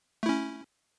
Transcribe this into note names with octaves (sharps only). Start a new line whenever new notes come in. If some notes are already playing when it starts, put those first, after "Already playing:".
A3 C#4 E4